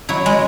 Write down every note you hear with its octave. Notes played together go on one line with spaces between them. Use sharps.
F#3 E4
G#3